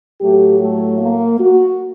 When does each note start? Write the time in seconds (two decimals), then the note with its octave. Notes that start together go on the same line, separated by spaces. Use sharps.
0.21 A2 F#3 A3 G4
0.61 A3
1.00 A#3
1.40 F#4